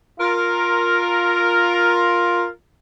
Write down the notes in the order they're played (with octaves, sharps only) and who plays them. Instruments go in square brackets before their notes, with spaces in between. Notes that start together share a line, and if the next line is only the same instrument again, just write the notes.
[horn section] F4 A#4